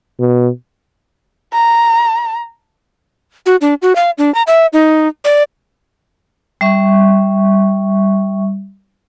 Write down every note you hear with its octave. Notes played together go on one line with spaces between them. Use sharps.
B2
A#5
F#4
D4
F#4
F5
D4
A#5
E5
D#4
D5
G3 E5 C#6